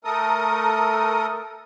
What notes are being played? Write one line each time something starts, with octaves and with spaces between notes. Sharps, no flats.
A3 A4 A#4 D#6